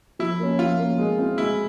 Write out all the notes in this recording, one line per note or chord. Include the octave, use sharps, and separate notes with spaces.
F3 E4
A#3 C#4
F3 F4
A#3 C#4
G#3
C4 E4
G#3 E4